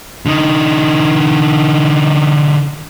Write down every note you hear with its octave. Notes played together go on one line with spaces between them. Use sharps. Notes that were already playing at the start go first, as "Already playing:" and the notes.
D3 D#4